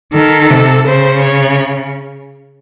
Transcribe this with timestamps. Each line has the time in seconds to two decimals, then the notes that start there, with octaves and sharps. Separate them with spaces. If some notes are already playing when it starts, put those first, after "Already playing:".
0.14 D#3 A4
0.50 C3
0.87 C#3 C5
1.24 C#5